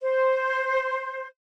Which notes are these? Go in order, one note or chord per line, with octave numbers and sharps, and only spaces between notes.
C5